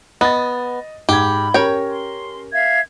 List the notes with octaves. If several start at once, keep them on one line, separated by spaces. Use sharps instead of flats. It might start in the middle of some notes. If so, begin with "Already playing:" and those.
B3 D#5 A6
G#2 G4 B5 G#6
C#4 G4 A#4 C#5 G5
C6
E5 F5 G#6